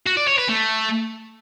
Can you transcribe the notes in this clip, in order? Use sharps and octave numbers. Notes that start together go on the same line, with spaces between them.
F#4
D5
C#5
B4
A3